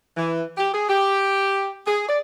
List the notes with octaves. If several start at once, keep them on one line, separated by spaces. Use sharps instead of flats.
E3
G4
G#4
G4
G#4
D5